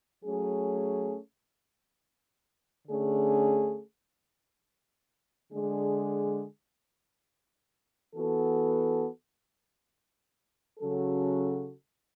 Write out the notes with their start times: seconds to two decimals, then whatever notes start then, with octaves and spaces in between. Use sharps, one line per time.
0.24 F#3 A3 C#4 G#4
2.87 D3 A3 C#4 G#4
5.52 D3 G#3 D4 G#4
8.15 E3 B3 F#4 A4
10.79 C#3 F#3 C#4 F#4 A4